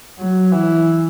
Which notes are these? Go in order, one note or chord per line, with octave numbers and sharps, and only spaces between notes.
F#3
E3